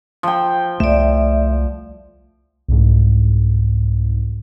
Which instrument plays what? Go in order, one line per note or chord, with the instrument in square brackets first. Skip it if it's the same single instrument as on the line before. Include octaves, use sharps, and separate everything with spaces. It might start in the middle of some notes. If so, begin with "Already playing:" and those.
[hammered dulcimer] F3 G5
[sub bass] C2 [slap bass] A3 [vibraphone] D5 E5
[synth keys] C2 G#2